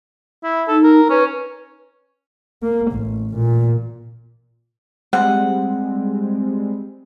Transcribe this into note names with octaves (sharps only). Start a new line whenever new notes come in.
E4
D#4 A4
A#4
C#4 B4
A#3
A1
A#2
G3 G#3 C4 F#5